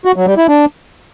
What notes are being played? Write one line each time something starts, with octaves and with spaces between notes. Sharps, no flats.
F#4
F#3
G3
E4
D4